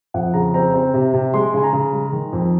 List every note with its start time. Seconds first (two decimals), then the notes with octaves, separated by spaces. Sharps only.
0.14 F2 F#5
0.34 C#3 A#5
0.54 C4 A#5
0.74 C4
0.94 C3
1.14 C3
1.34 G#3 C6
1.54 C#3 G#5
1.63 A#5
1.73 C#3
1.93 G#3
2.12 D#3
2.33 F2